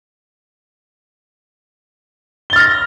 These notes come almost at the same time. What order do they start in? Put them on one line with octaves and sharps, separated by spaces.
G7 A6 F6 A#6